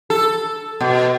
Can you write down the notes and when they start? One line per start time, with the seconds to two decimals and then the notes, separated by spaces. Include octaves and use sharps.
0.10 A4
0.80 B2